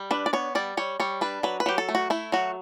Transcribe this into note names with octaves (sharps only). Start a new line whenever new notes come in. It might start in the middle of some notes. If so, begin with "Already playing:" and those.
Already playing: G3
D4 B4
D5
B3 C#5
G3 D5
G3 C#5
G3 C#5
D4 B4
F#3 B4
B4
F#3 G4
A4
A3
F#4
A3 E4
F#3 F#4